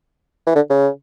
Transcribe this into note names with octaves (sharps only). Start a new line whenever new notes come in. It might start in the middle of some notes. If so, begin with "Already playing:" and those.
E3
D3
C#3